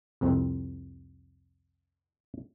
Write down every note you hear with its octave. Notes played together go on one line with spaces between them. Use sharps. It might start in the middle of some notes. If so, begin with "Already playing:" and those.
C2 F2 C4